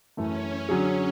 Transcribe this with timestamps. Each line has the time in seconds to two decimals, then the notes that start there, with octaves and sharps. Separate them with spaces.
0.17 F#2 E3 A3 C#4
0.69 D3 F#3 C#4 G#4